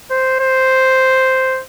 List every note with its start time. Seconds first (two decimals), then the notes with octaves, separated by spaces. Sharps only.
0.11 C5
0.40 C5